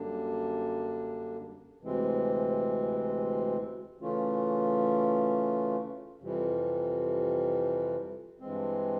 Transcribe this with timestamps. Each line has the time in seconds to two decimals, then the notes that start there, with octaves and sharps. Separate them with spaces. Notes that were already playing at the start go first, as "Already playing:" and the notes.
Already playing: F#2 D3 G3 A#3 D4
1.81 D2 C3 E3 G#3 C4
4.01 C#3 E3 A3 C#4 F4
6.21 F2 C3 E3 G3
8.40 G2 E3 G#3 C4